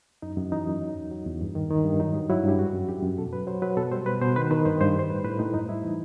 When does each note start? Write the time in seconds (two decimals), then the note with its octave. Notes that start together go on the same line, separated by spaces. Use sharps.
0.22 F#2 D#4
0.37 F#2
0.52 E3 D#4
0.67 F#2
0.82 F#3
0.96 E2
1.11 F#3
1.26 E2
1.41 G2
1.55 D#3
1.70 D#3
1.85 G2
2.00 F#3 D#4
2.14 G2
2.29 F#3 E4
2.44 G2 G4
2.59 F#2 F#4
2.74 F#2
2.89 F#2 G4
3.03 F#2
3.18 B2 A4
3.33 F#3 B4
3.47 F#3 C5
3.62 F#3 B4
3.77 B2 A4
3.92 G3 C5
4.06 B2 B4
4.21 B2 C5
4.36 D#3 B4
4.51 D#3 B4
4.66 G2 C5
4.81 G2 C5
4.95 G3 C5
5.10 A2 B4
5.25 A2 B4
5.39 A2 D#4
5.54 F#2 D#4
5.69 G3 E4
5.84 E3 D#4